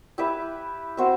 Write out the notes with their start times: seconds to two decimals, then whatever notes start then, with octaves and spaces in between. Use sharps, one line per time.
0.18 E4 G4 B4 E5
0.97 C4 F#4 C5 E5